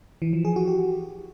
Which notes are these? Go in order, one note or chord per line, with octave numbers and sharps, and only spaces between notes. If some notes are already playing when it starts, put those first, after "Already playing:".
E3
F3
G#4
F#4
G4